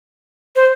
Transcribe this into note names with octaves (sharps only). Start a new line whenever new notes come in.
C5